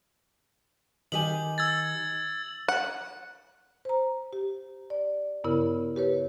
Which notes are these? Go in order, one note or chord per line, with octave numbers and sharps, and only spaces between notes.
D#3 G4 G#5 F#7
E6 G#6 A6
F#5
C5 A#5
G4
D5
G2 C#3 B3 E4 A#4
G4 B4 C#5